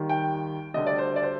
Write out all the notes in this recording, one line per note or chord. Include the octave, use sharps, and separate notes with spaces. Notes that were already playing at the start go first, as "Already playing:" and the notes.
Already playing: D#2 D#3 G3
G5
D2 D3 G3 D#5
D5
C5
D5
C5